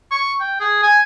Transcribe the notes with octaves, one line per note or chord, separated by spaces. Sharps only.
C#6
G5
G#4
G#5